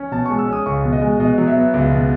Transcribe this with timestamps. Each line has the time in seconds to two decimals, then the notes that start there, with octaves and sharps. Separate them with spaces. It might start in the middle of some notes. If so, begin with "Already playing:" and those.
Already playing: C#4
0.12 B2 A5
0.26 G#3 C#6
0.39 E6
0.48 C#4 D#6
0.66 C#2 C#6
0.84 B2
0.93 D#5
1.02 G#3
1.20 B2 D#5
1.38 F#3
1.47 E5
1.56 B3
1.74 C#2
1.92 B2